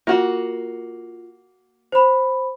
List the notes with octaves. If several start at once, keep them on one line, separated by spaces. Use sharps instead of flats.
A#3 F4 F#4
C5 B5